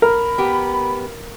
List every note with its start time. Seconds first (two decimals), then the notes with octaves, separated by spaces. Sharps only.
0.02 A#4 B5
0.38 B3 G4